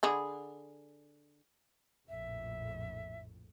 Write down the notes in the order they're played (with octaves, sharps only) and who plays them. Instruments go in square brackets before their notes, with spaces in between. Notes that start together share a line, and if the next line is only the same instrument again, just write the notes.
[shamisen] D3 G#4 B5
[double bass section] A#1 F2 A2 [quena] E5